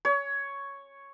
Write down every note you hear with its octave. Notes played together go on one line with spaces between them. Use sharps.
C#5